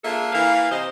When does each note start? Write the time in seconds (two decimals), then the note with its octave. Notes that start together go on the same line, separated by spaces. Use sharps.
0.04 A#3 D4 F4 G#4 A4 E5
0.33 E3 A#3 B4 F5
0.71 C3 C5 D#5